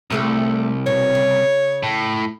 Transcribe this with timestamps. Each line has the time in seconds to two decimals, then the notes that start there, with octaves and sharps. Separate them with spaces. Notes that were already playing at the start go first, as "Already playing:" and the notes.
0.10 C2 C3 A3 G#4
0.86 B2 C#5
1.15 C#3
1.83 A2